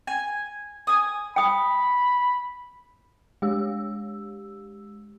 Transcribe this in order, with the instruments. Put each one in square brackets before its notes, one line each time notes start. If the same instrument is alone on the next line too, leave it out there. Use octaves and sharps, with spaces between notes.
[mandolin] G#5
G#5 D#6
[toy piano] G5 D#6 [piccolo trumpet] B5
[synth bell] G#3 G4 E6